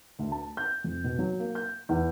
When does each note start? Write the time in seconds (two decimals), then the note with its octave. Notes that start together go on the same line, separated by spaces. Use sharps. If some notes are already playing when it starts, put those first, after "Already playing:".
0.19 D2
0.32 A5
0.57 G6
0.84 F2
1.04 B2
1.19 F#3
1.39 A#3
1.55 G6
1.89 E2